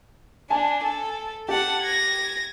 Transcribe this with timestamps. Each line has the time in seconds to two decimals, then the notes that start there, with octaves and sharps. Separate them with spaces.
0.50 D4 G#5 A5
0.85 A4
1.48 G4 F#5 A5
1.82 G#6 A#6